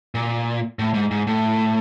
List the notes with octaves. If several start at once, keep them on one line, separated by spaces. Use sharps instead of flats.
A#2
A2
G#2
G#2
A2